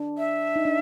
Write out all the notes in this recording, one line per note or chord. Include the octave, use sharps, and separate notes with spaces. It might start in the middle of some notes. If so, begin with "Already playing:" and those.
Already playing: D4
E5
D#4
D4